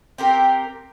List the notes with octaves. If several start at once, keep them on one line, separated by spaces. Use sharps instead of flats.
C4 G4 A#4